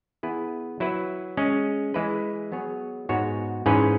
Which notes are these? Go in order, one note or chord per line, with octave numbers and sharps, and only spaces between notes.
E3 B3 E4 G#4 B4
F#3 E4 B4 E5
G#3 C#4 G#4
E3 G#3 E4 B4
F#3 B3 G#4 C#5
G#2 G#3 B3 F#4 C#5
G#2 E3 C#4 G#4 B4